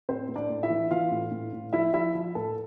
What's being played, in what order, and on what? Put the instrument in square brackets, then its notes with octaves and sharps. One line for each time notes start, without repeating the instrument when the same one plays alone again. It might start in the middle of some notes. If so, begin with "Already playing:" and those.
[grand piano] A2 C4 C5
A2
D4 D5
A2
E4 E5
E3
E3 F4 F5
A2
A2
A2
F3 E4 E5
F3 E4 E5
F3
A2 A4